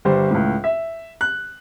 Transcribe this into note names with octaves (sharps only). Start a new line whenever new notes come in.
G1 G3 C5
C#2 A2
E5
F#6